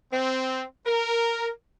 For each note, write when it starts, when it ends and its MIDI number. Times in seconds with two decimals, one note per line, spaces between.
0.13 0.64 60
0.86 1.49 70